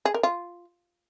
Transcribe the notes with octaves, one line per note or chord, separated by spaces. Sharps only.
G#4
A#4
F4